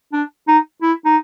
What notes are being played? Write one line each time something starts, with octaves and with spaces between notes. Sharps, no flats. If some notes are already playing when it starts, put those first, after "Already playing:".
D4
D#4
E4
D#4